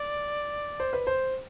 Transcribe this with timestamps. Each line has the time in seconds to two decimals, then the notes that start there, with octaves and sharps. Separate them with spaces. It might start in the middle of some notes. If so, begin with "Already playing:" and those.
Already playing: D5
0.80 C5
0.93 B4
1.07 C5